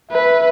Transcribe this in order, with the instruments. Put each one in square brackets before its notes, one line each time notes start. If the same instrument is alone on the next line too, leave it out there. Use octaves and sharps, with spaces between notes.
[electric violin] B4 [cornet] E5